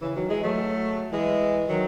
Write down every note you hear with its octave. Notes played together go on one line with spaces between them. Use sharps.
C#3 E3
D#3 F#3
E3 G#3
F#3 A3
E3 G#3
D#3 F#3